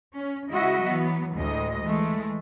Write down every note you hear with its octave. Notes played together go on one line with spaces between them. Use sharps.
C#4
C#3 G#3 E4 F#4 D#5 E5
E3 F#3 B3
D2 A2 G#3 D#5
E3 G#3 A3